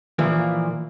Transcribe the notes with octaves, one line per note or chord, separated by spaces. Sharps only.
A#2 E3 F3 A#3